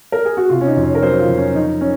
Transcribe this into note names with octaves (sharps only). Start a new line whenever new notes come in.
A#4
G#4
F#4
C3 F4
C#4
D#4
F2
C#5
A#4
F#3 C5
F4
F2
C#4
F3 D#4
C#4